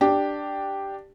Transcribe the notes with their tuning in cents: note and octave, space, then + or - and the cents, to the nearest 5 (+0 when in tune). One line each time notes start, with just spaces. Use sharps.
D4 +5 G4 +0